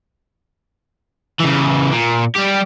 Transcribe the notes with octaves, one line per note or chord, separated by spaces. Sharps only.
C#3 E3
A#2
G3 G4